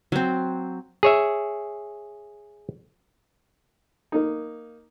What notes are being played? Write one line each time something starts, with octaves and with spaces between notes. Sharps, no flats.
F#3 C4
G#4 C#5 E5
A#3 D#4